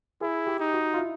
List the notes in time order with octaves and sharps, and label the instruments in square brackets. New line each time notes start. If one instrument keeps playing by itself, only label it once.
[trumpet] E4 [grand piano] G#4
[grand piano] G4
[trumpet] D#4
[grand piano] F#4
F4
E4